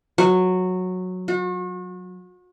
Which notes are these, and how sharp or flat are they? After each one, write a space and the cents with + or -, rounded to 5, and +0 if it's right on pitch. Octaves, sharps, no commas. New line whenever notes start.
F#3 -10
F#4 -40